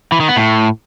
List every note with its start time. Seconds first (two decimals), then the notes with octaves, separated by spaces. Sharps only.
0.12 E3
0.20 D#3
0.28 B3
0.37 A2